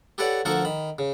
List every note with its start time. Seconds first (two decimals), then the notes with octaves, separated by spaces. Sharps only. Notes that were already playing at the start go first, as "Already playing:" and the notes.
0.18 G4 A4 B4 C#5 D5 F#5
0.45 D2 F3 A4 A#4 F#5 C#6
0.65 D#3 B5
0.99 C#3